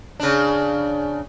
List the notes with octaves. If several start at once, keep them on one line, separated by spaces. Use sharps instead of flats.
C#3 D4